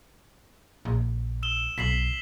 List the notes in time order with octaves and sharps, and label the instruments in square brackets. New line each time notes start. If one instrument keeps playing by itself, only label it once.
[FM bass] A#1
[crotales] E6 E7 G7
[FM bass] B1 [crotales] B6 C7 F#7